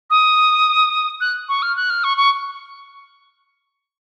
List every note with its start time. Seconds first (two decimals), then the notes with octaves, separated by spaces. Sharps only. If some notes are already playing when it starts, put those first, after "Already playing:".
0.10 D#6
1.21 F#6
1.49 C#6
1.62 F6
1.77 F#6
1.90 F6
2.04 C#6
2.17 C#6